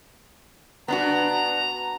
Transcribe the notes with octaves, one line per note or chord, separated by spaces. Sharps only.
B3 D4 F#4 A#5